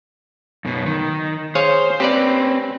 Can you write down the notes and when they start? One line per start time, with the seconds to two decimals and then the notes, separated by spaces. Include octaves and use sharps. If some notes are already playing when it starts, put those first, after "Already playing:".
0.65 F#2 B2
0.86 D#3
1.55 G#4 C5 C#5 F5
2.00 C4 C#4 G4 B4 D5